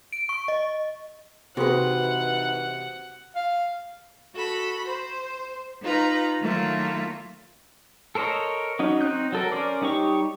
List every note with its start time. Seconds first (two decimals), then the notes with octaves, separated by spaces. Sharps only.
0.13 D7
0.29 C#6
0.48 D#5
1.57 C3 E3 D#4 F#4 G#4 B4 C5 F#5
3.36 F5
4.34 F#4 A4 B5
4.88 C5
5.82 D#4 F4 B4 A#5
6.41 D#3 F#3 A3 A#3 E4 F4
8.15 A4 A#4 C5 C#5 D#5
8.79 F#3 C#4 D#4
9.01 C4 D#4 F#6 G6
9.32 F#3 A4 A#4
9.52 C#4 A#4 C5 D5
9.81 G3 D#4 G4 C#5 C#6